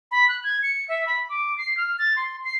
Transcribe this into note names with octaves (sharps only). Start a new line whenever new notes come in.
B5
F#6
G#6
C#7
E5
B5
D6
C7
F6
A6
C6
C7